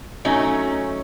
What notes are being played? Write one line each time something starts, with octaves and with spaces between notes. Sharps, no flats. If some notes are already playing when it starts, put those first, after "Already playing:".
F#3 A3 C#4 D#4